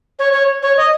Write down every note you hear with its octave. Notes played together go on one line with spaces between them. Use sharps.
C#5
C#5
C#5
D#5